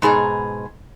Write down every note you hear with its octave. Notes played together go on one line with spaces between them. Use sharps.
G#2 B2 G#4 A#5